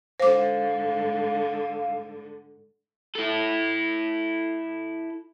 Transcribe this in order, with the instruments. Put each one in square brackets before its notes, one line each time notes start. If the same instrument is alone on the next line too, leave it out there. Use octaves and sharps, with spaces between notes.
[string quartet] G#2 D3 [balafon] C5 D6 [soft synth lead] F5
[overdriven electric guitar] E4 A4